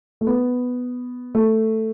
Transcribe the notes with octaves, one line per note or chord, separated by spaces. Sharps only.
A3
B3
A3